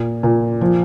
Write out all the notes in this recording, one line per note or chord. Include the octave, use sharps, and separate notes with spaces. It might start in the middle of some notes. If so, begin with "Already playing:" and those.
Already playing: A#2
A#2
F3